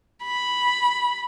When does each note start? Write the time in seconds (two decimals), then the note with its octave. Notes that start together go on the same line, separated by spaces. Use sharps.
0.25 B5